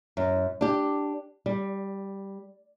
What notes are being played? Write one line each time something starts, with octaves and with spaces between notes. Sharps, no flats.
F#2
D4 G4
G3